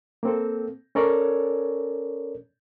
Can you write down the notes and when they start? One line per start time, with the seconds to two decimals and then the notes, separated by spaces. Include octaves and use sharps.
0.23 A#3 C4 A4
0.95 C#4 A4 A#4 C#5 D5